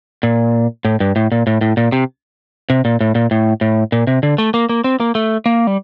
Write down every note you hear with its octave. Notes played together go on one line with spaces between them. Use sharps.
A#2
A2
G2
A2
A#2
A2
A2
A#2
C3
C3
A#2
A2
A#2
A2
A2
A#2
C3
D3
A3
A#3
A#3
C4
A#3
A3
A#3
G3